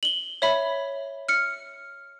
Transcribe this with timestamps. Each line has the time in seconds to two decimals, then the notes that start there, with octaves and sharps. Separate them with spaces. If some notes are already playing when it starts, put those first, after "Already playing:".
0.03 F#7 G7
0.42 C#5 E5 B5
1.29 F6 C#7